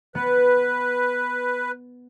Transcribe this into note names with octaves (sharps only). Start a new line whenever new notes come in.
B3 B4